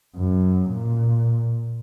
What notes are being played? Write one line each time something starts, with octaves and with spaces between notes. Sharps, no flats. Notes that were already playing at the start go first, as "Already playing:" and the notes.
F#2
A#2